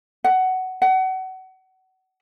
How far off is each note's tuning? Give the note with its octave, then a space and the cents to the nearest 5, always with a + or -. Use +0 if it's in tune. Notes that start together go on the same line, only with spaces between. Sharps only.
F#5 +15
F#5 +30